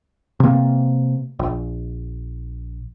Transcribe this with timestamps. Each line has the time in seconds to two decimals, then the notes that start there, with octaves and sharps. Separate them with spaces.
0.40 C3 A#3
1.39 A#1